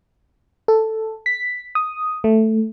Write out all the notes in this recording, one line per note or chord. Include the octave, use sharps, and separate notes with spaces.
A4
B6
D#6
A3